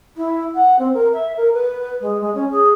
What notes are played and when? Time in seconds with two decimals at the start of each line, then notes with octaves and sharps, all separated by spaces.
0.16 E4
0.54 F#5
0.78 C4
0.94 A#4
1.13 E5
1.36 A#4
1.53 B4
2.00 G#3
2.21 G#3
2.34 C#4
2.51 G#4